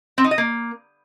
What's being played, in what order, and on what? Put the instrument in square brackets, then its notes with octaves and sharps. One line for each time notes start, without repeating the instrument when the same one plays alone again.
[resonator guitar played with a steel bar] C4
D#4
D#5
A#3